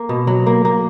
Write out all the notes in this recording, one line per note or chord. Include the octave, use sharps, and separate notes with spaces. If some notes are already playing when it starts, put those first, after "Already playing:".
Already playing: A#3
B2
F#3
A#3
A#3